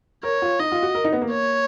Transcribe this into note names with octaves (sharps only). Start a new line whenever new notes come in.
A#4 C#5
F4
D#4 D#5
F4
F#4
A#4
D#4
B3
A#3
C#5